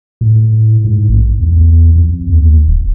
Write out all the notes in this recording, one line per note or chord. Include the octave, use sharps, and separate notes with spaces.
A2
G#2
A#1
E2
F2
D#2
D1